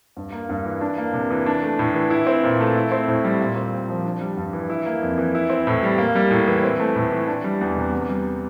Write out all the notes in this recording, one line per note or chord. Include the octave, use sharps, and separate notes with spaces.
G2
A#3
G2
E3
D4
A#3
C3
E3
D4
A3
A2
E3
E4
C4
A#2
A3
E4
C4
A2
G3
A#2
C4
A#2
F3
D4
G3
G2
E3
E4
A#3
F2
E3
E4
C4
A2
G3
A#3
G3
A2
E3
C4
A3
A2
E3
D4
G3
E2
C3
E2
G3